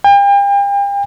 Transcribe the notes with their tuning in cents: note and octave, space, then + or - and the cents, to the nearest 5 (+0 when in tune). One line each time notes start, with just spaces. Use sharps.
G5 +40